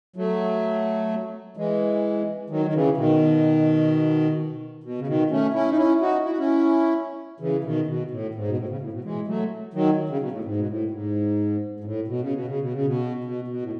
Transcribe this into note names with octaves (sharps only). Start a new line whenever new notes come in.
F#3 A3
E3 G#3
D#3 F#3
D#3
C#3 E3
B2 D#3
B2
C#3
B2 D#3
A3 C#4
C#4 E4
D#4
C#4 E4
D#4 F#4
E4
F#4
C#4 E4
C#3 E3
B2 D#3
B2
A2
G#2
B2
A2
C#3
A2
B2
E3 G#3
F#3 A3
D#3 F#3
C#3
B2
A2
G#2
B2
A2
G#2
G#2
A2
B2
C#3
B2
C#3
B2
C#3
B2
B2
B2
A2